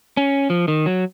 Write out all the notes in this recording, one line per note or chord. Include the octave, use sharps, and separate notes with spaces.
C#4
F3
D#3
F#3